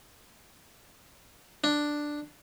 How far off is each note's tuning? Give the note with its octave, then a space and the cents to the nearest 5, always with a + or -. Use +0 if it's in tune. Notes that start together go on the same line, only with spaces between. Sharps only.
D4 +5